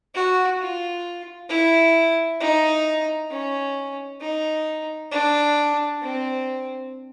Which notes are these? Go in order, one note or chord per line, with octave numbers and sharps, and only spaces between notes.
F#4
F4
E4
D#4
C#4
D#4
D4
C4